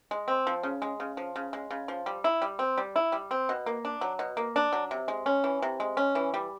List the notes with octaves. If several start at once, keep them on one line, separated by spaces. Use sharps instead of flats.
G#3
C4
F3
C#3
G#3
C#3
F3
C#3
G#3
C#3
F3
G3
E4
G3
C4
G3
E4
G3
C4
B2
A#3
D4
F#3
B2
A#3
D4
F#3
C3
G#3
C#4
E3
C3
G#3
C#4
E3
G3